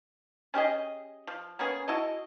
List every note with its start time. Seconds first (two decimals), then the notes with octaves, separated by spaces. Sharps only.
0.54 C#4 G4 G#4 D#5
1.27 F3
1.59 A#3 B3 C#4 G#4
1.88 E4 F#4 A4 D#5